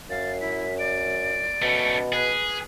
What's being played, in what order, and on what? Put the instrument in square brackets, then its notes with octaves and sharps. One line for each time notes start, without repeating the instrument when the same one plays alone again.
[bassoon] F#2 [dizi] F5 [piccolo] A6
[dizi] E4 [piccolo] B6
[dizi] D5 [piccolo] D7
[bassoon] B2 [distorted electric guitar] A3 C#4
[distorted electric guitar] G#4 [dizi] B4